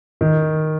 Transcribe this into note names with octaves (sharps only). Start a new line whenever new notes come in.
D#3